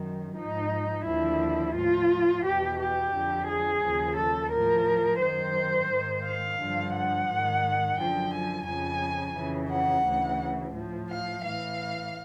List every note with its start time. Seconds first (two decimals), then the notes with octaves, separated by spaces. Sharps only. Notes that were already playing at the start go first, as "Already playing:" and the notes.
Already playing: F#2 D#3
0.36 G#2 F3 D#4
1.06 D#2 D3 F3 E4
1.75 A2 F3 F4
2.44 E2 B2 G4
2.78 G4
3.13 F2 D3 F3
3.48 G#4
3.83 D#2 C#3 F3
4.17 A4
4.52 A2 F3 A#4
5.21 F#2 D#3 C5
5.90 G#2 D#3
6.24 F5
6.59 G2 D3 F3
6.94 F#5
7.28 G#2 D#3
7.97 F#2 D3 F3 G5
8.32 G#5
8.67 F2 C#3 F3 G#5
9.36 F2 C#3 E3
9.71 F#5
10.05 D2 C#3 E3
10.74 A2 F3
11.09 F5
11.44 A2 E3 F5